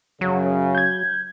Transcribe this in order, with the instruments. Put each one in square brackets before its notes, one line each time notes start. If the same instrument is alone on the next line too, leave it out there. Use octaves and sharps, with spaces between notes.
[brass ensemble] F#2 C#3 [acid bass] F#3
[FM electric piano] G6 G#6